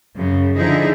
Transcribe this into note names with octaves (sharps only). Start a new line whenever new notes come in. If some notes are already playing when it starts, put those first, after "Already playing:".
F#2 C#3
D3 F3 D#4 E4 G#4